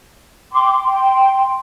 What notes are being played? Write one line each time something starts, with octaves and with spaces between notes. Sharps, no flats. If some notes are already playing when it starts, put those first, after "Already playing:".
G5 C6 D6
G5 C6